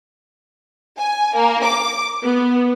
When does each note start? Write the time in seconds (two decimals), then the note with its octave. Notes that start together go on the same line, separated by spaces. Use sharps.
0.98 G#5
1.35 A#3
1.64 D6
2.23 B3